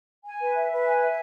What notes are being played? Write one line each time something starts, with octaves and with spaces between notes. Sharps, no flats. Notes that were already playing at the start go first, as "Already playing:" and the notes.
G#5
B4
E5
B4
G#5
E5